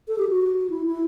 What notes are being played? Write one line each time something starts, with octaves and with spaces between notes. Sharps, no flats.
A4
G4
F#4
E4
E4